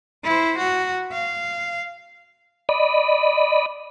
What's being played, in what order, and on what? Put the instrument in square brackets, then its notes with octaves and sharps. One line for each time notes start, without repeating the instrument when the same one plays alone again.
[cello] E4 C5
F#4
F5
[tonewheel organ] D5 D#5 B5